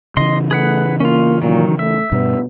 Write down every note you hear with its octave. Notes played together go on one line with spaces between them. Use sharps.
C#3 E3 D#5 C6
A3 G#4 B4 F#5
A#3 C#4 F4
A#2 D#3 F#3
A3 E5
G2 B2 B3